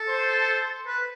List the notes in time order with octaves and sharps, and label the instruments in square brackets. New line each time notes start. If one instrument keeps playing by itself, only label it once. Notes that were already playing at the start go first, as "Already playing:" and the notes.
Already playing: [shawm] A4
[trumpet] C5
[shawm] B4